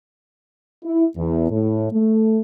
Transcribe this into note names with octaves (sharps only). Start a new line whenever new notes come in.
E4
E2
A2
A3